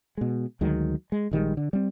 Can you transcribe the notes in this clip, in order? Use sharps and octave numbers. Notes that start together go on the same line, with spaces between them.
B2 G#3
D2 D#3 F#3 G#3
G#3
A#1 D#3 G3 G#3
D3
G3 C4